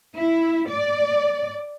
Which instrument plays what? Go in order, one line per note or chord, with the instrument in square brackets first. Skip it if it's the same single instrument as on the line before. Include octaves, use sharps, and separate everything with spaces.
[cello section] E4
D5